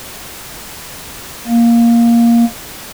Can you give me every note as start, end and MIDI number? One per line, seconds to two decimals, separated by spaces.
1.47 2.44 58